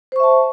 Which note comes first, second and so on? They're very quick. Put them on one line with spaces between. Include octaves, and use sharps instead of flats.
C5 C#6 E5 A5